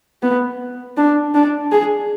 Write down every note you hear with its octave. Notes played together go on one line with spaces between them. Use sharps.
B3
D4
D4
G#4